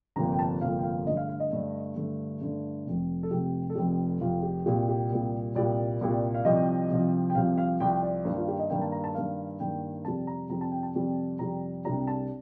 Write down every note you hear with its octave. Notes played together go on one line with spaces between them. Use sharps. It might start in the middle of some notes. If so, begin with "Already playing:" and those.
G1 F2 C3 F3 A#3 A#5
G5
A5
G1 F2 C3 F3 A#3 F5
G5
F5
G2 D3 A3 D#5
F5
F5
D#5
G2 D3 A3
G2 D3 A3
G2 D3 A3
F1 F2 C3
A4
F1 F2 C3 G4
A4
F1 F2 C3 G4
F1 F2 C3 F4
G4
C2 A#2 G3 G4
G4
C2 A#2 G3
C2 A#2 G3 D5
C2 A#2 G3
F5
C2 C3 F3 C4 D#5
C2 C3 F3 C4
G5
C2 C3 F3 C4 F5
F5
C2 C3 F3 C4 G5
D5
G2 D#3 A#3 C5
F4
G4
D#5
G2 D#3 A#3 G5
A5
A#5
A5
G2 D#3 A#3 F5
G2 D#3 A#3 G5
F2 C3 G3 C4 A5
A#5
F2 C3 G3 C4 A#5
A5
G5
A5
F2 C3 G3 C4
F2 C3 G3 C4 A#5
C2 C3 G3 D4 A#5
A5